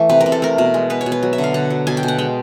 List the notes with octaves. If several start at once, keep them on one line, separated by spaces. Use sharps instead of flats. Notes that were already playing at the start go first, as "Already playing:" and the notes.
Already playing: E3 A3
C3 B4
A#4
C3
A4
A3 A#4
B2
G#3
B3 B4
C#5
B2
B4
F#3
E5
D3
F5
D3 F#5
F#3
B2 G#5
G5
B2
F#5
G#3 G5